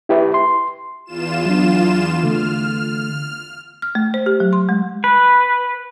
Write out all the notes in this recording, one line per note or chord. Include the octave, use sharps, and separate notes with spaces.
E4 G4 B4 E5
C6
E2 F4 E7
F#3 D4
D3 A3 F6
F6
A3
C5
G4
F#3
C6
G#3
B4